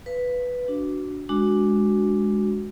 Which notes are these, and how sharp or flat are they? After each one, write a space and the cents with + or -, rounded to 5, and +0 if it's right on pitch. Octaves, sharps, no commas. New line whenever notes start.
B4 +0 F5 -35
D4 -10 F#4 +0
G#3 +0 D4 +0 F#4 +0